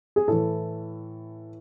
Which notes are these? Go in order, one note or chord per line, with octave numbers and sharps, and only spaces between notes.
G#4
A2 E3 A4